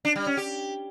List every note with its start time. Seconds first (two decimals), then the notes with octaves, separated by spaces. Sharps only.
0.05 D4
0.16 G3
0.26 C#4
0.37 G4